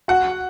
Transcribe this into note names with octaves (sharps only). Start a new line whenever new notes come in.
F#4 F#5